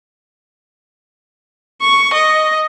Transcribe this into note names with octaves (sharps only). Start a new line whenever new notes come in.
C#6
D#5